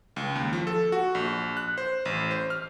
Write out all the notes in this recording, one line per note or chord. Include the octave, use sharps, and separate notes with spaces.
C#2
D#2
F3
A4
F#4
A#1
F#6
C5
A1
C5
F6